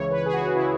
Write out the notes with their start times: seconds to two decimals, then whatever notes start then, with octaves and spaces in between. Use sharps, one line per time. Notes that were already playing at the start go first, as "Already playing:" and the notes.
Already playing: C#2 C#3 E3 C#5
0.11 B4
0.26 G#4
0.33 F#4
0.55 C#3 E3 E4